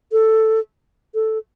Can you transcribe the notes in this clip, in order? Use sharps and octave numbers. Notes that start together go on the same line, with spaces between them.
A4
A4